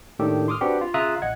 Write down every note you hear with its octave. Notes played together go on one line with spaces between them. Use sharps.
A2 D#3 A#3 D4 G4 A4
C6 D6 D#6 F6
C4 D4 F#4 G4 B4 F#5
F4
C#3 F4 E5 A#5 D#6 F#6
A1 D#5 F#5 G#6